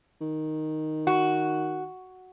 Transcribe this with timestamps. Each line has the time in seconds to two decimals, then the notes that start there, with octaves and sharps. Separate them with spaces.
0.21 D#3
1.07 F#4